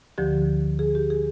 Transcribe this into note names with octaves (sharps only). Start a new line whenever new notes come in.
D2 D3 F3 G4
G#4
G4
G#4